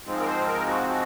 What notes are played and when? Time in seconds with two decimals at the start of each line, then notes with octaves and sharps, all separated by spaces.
0.05 G#2 F3 G#3 C4
0.20 A#4
0.26 C5
0.46 A#4
0.67 F#4
0.89 F#4